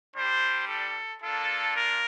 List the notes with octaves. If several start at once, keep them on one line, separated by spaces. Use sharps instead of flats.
G3 D4 G4 C5
A4
A#3 D4 F4 A4
A#4